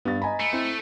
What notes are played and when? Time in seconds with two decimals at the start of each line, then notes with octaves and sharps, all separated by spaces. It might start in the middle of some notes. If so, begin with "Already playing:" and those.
0.05 G2 B3 A6
0.22 D#5 G#5 A#5 B5
0.40 A3
0.53 C4 E4 C5